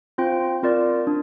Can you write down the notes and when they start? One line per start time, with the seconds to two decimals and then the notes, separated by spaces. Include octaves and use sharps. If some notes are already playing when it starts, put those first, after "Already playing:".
0.18 C4 F4 C5 G5
0.63 C4 F4 A#4 D5
1.07 D4